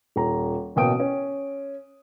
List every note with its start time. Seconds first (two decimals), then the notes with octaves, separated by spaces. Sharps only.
0.16 D#1 A#5
0.76 A1 B2 A#3 G5 D#6 D7
1.00 C#4